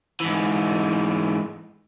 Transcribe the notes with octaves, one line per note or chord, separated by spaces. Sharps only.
G#2 E3